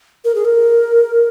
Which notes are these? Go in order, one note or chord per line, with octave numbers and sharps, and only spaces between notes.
A#4
G#4
A#4